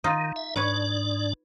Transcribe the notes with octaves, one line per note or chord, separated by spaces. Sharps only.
D#3 D#4 F4
E5
G#2 D4 B4 C#5 D5